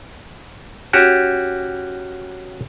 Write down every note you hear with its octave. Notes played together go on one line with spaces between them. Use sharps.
C#4 F#4 G4